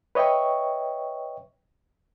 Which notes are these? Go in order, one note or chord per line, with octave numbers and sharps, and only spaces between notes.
B4 C#5 D#5 E5 G5 C#6